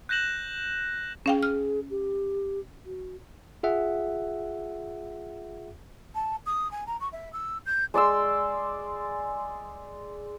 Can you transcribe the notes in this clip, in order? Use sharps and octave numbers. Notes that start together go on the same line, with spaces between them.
F#6 G6 A#6 E7 F#7
C#4 G#4 F5 G5
F6
G4
F#4
F4 G#4 E5 F#5
A5
D#6
G#5
A#5
C#6
E5
E6
G6
G#3 D5 C6 E6